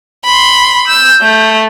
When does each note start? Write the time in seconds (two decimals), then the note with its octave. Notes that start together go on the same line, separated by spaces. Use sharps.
0.25 B5 C6
0.87 E6 G6
1.21 A3